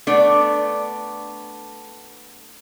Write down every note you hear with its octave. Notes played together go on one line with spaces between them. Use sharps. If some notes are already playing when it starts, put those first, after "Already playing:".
A3 B3 D4 D5